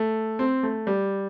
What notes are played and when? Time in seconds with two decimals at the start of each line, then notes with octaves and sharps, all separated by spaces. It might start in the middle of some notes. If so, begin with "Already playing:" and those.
Already playing: A3
0.39 C4
0.63 A3
0.87 G3